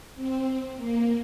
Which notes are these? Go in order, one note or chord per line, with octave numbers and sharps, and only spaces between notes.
C4
A#3